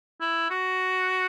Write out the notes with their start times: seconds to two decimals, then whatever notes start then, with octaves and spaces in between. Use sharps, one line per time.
0.21 E4
0.50 F#4